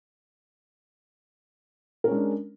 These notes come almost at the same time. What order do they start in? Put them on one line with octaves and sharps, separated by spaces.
A#4 C#4 G#3 D4